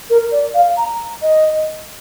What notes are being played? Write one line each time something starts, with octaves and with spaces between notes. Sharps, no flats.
A#4
D5
F5
A#5
D#5